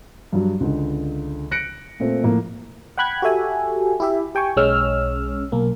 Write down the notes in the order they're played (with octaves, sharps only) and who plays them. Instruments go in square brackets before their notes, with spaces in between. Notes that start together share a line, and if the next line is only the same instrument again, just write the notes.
[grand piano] G2 F#3
C#2 D3
F#6 A#6 C#7 D7
A#2 A3 C4
A2 F3 A#3
[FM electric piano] F#5 G5 B5 F#6 G#6
F#4 G4 A4 E5 G#5
E4 G4 E5
G4 G5 G#5 C#6
B1 G#3 C#4 C#5 E6 F6
B1 A#3